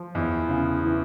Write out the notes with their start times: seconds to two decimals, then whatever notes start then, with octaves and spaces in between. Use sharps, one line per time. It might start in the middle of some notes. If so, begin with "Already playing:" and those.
Already playing: F3
0.15 E2
0.49 C#3
0.85 E3